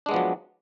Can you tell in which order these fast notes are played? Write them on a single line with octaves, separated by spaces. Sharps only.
D4 G#3 B3 F3 F#3